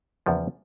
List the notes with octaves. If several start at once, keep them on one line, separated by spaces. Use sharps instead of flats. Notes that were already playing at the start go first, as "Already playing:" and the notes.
E2 C#3 F3 A#3